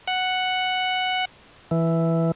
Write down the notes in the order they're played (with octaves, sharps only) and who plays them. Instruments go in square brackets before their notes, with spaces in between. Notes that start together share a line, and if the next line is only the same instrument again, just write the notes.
[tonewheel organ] F#5
E3